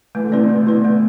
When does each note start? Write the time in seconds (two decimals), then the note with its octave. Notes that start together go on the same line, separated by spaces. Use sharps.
0.15 E3 A3
0.24 D3
0.32 C3 E4 B4 D5
0.40 B2
0.50 A3
0.67 E4 B4 D5
0.84 A3